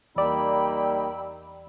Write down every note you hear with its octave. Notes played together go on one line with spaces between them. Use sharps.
E2 G3 A#3 D#4 D5 G5 B5 E6